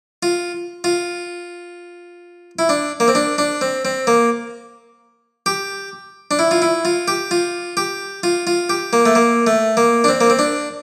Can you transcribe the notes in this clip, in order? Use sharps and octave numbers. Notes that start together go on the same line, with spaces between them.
F4
F4
E4
D4
A#3
C4
D4
D4
C4
C4
A#3
G4
D4
E4
F4
E4
F4
G4
F4
G4
F4
F4
G4
A#3
A3
A#3
A3
A#3
D4
C4
A#3
C4
D4